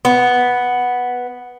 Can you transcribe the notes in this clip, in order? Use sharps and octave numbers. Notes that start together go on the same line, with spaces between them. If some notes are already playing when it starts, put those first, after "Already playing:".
B3